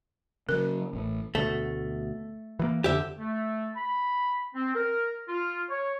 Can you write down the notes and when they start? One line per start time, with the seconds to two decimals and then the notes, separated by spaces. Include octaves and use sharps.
0.49 C#3 F#3 A#4
0.93 A1 A2
1.35 D2 B2 A3
2.59 E3 F3 A#3
2.84 F2 D3 G4 E5
3.18 A3
3.76 B5
4.55 C4
4.75 A#4
5.28 F4
5.69 C#5